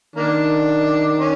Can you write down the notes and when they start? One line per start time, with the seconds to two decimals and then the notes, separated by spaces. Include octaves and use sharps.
0.16 D#3 A#3 D4
1.20 C#4